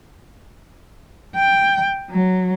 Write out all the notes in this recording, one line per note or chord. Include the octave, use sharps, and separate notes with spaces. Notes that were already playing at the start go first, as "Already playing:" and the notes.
G5
F#3